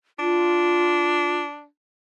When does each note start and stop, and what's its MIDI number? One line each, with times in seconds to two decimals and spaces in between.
0.19 1.66 62
0.19 1.38 65